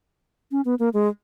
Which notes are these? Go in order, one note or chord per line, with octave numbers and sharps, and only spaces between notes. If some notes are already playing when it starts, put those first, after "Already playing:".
C#4
B3
A#3
G#3